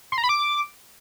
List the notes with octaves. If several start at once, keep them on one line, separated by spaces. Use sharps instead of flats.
C6
A#5
B5
D6